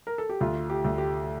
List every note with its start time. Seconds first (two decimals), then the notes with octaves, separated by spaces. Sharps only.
0.07 A#4
0.18 A4
0.30 G4
0.41 D2 F4
0.70 G4
0.84 D2
0.98 G4